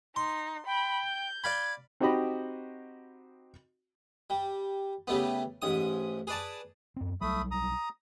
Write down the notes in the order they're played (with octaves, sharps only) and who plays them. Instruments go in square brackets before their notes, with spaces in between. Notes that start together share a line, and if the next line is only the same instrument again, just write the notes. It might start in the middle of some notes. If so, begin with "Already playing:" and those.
[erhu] D#4 [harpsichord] C6
[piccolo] G5 [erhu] B5
[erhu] G6
[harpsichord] D5 F5 B5 [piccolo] G#6
[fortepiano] C4 D#4 F#4 G4 D#5 B5
[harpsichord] G3
C#3 G3 A3 B3
A1 G#2 D#6
G#4 B4 D5 A5
[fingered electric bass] F#2 B3 C4
[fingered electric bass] B1 F#3 G3 [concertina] A3 B5 D#6
[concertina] A#5 D#6